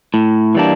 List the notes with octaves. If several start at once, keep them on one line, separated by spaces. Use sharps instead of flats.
A2
E3 G3 A#3 D4